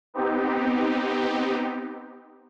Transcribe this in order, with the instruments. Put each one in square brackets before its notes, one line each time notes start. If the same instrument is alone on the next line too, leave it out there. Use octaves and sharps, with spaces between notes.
[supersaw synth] B3 C4 D#4 G4